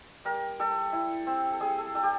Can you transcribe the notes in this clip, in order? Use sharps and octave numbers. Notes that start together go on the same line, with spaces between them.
G3 A#4
G3 A4
E4
C4
A4
G3 G#4
A4
G3 A4
G4